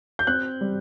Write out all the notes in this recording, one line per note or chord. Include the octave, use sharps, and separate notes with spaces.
G6
C4 F#6
G3